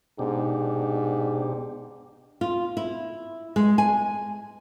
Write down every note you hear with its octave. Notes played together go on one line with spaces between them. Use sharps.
G#2 B2 D4 G4
F4
E4
G#3
G#5